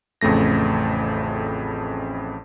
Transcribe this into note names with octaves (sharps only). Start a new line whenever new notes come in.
A1 F2 C#3 A3 A#6